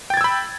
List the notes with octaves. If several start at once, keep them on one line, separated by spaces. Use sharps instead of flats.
G5 B5 E6 G#6 A6